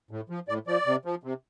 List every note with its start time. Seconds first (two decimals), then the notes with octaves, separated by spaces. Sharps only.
0.11 A2
0.30 F3
0.48 A2 D5
0.67 F3 D5
0.86 C3
1.05 F3
1.24 C3